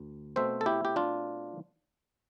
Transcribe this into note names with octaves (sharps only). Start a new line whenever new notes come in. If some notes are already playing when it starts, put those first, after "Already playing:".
Already playing: D2
B2 A3 C4 C5 E5
A4
E4 G4
G4
D4 F4